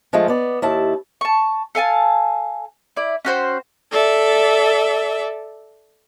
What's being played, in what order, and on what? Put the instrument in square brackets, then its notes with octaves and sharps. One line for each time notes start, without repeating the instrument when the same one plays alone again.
[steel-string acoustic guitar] F3 G#3 A3 F4
B3 D5
D#2 E4 A5
[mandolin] A5 C#6
A4 F5 G#5 A5
E4 D5
C#4 F#4 C5 G5
[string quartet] A4 D5 E5